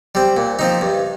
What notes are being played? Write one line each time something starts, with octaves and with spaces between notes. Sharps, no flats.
G3 C4
A#2
F3 C4 D#4
G2